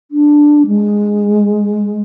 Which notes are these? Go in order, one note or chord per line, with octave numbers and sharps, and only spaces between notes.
D4
G#3